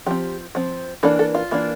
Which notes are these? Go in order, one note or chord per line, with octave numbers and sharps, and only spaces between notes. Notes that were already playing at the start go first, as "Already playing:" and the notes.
F3 C4 G4
F3 C4
E3 A#3 D4 A4
A4
F4
E3 A#3 D4